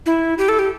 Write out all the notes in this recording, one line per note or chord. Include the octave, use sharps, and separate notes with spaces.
E4
G4
A4
G4